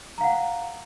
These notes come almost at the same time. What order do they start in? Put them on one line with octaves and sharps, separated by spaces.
A#5 F5 F#5